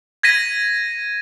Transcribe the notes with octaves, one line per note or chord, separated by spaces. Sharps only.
G#6 A#6 B6 D#7